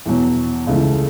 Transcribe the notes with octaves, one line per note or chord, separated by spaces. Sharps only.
E2 B2 F#3
C#2 C#3 E3 A3